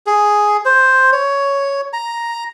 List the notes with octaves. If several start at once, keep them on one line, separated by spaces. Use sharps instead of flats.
G#4
C5
C#5
A#5